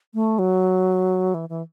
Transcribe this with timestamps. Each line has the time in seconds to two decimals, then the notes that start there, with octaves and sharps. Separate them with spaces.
0.14 A3
0.39 F#3
1.34 E3
1.49 E3